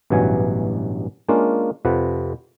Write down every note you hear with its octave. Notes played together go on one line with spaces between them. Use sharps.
A1 G2 B2 E3 F#3 G#5
G#3 A#3 C#4 D4 F4
F2 C3 F3 B4 F#5